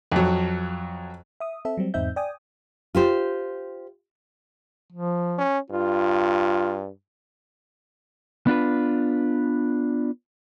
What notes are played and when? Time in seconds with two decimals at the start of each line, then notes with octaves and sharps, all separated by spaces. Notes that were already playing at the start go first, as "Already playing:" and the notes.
0.12 F2 F#3
1.40 E5 D#6
1.65 C4 A4 E5
1.77 F#3 G3 C4
1.94 E2 G#2 C4 D#4 E5 G6
2.16 D5 G5 G#5 D#6
2.95 F4 G4 C5
4.93 F3
5.39 C#4
5.70 G2 F4
8.47 B3 D4 F4 B4